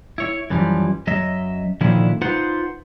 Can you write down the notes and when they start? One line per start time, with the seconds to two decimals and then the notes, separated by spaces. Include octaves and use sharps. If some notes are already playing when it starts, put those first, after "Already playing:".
0.18 E4 C#5
0.50 F#2 E3 F3 G3
1.07 F#2 F#3 D#5 E5
1.81 A#2 D3 D#3 F3 C#4 E4
2.21 D#4 F4 B4 C5 F#5